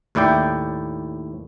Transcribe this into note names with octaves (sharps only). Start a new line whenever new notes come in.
D#2 A2 E4 D5 G5